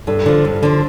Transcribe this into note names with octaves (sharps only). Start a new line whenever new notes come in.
G2 A4
D3 F3
G2
D3 F3